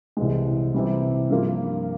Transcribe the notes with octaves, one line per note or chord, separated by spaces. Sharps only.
C2 C3 E3 G#3
C3 E3 G3
G2 F3 A#3 F4